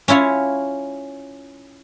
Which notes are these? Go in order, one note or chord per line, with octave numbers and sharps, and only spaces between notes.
C#4 E4 F4 C#5